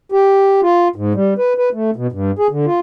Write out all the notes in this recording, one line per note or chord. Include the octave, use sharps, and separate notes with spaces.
G4
F4
G#2
G3
B4
B4
A3
B2
G2
G#4
D3
F4